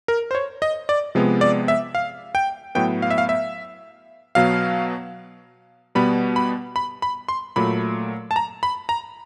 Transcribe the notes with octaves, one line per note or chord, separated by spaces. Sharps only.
A#4
C5
C#5
D#5
D5
C3 F3 G#3 B3
D5
E5
F5
G5
A2 F#3 B3 G5
F5
E5
F5
E5
B2 F#3 B3 F5
B2 G3 B3 B5
B5
B5
B5
C6
A#2 F#3 A3 B5
A5
A#5
B5
A#5